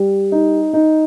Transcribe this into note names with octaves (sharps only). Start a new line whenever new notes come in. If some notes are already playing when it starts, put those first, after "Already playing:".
Already playing: G3
D#4
D#4